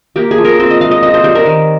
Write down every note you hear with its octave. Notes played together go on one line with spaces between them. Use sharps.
A#3 G4
G#4
F3
A#4
C4 C5
D#5
G#3 F5
D#5
C4 D#5
C5
G3 C5
A#4
D#3